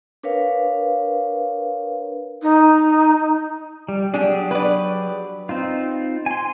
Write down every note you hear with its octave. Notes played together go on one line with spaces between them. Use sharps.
D4 A#4 B4 C#5 F5
D#4
G3
F#3 D4 G4 G#4
B4 D5
C4 D#4 F4
G#5 C6